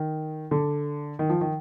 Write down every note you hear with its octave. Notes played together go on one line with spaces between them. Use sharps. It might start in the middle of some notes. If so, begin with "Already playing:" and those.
Already playing: D#3
D3
D#3
F3
D#3